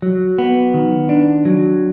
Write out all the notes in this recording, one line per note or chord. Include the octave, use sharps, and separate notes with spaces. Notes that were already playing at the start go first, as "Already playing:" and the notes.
F#3
B3
D#3
D4
F#3